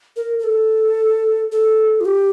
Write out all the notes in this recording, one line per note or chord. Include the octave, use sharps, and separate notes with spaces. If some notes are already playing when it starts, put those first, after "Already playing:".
A#4
A#4
A4
A4
F4
G4